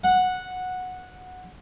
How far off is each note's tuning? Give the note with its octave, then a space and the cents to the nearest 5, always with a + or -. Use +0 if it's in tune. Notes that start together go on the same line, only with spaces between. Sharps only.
F#5 -10